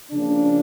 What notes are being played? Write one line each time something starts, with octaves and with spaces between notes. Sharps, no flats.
C#3 F3 A#3 D4